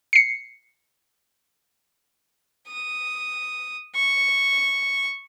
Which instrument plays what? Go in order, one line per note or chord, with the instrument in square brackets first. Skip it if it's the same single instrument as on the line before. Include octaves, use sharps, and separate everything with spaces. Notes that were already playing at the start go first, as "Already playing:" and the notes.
[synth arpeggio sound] C7 C#7
[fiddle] D#6
C#6